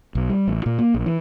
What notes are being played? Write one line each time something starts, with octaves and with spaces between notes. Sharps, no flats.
B1
G3
A1
A#2
A#3
A#1
E3